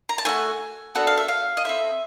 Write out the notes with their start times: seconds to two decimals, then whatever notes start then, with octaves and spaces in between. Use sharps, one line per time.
0.09 A#5
0.18 A5
0.25 A3 D4 F#4 G#5
0.95 B3 D4 F#4 A4 F#5
1.07 F5
1.17 E5
1.28 F5
1.57 D#5
1.65 C4 E4 A4 E5